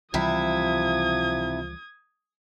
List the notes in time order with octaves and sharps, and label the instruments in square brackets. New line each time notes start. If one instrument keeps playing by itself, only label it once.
[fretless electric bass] C#2 E3 G3 [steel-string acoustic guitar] C3 E4 [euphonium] F3 [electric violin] D#6 G#6